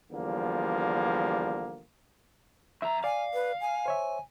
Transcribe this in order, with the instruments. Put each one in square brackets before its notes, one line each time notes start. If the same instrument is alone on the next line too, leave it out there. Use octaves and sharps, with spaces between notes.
[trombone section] E2 D3 F3 G3 A#3
[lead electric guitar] F2 A#5 [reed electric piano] E5
[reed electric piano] D5 [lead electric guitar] F5 [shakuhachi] G#5
[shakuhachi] B4
G#5
[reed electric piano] C5 C#5 E5